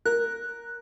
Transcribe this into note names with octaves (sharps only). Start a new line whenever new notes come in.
A#4 F#6